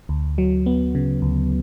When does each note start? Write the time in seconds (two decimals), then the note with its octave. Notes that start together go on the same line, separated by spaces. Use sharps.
0.09 D2
0.38 F#3
0.66 B3
0.95 C#3
1.22 D2